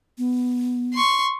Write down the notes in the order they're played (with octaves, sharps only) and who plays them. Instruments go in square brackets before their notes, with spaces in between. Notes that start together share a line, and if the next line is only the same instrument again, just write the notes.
[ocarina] B3
[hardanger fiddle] C6 C#6